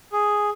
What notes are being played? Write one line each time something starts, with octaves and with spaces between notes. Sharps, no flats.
G#4